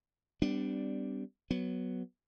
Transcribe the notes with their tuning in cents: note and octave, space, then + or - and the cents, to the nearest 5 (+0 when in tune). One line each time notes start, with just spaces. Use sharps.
G3 +0 B3 +40 D4 -5
F#3 +0 B3 +0